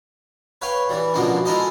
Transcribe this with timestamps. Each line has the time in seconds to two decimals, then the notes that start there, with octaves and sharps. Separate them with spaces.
0.62 B4 C#5 F5 G5
0.89 E3 G3
1.14 B2 D3 F3 G#3 A#3 C#4
1.45 G#3 A3 E4 A#4 C5 D#5